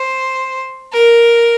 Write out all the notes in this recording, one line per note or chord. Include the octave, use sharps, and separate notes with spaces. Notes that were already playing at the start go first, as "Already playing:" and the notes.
Already playing: C5
A#4